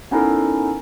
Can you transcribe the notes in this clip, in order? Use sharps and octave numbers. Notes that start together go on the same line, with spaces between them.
B3 C#4 D#4 E4 A4 A#4